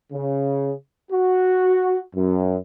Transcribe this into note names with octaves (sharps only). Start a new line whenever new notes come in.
C#3
F#4
F#2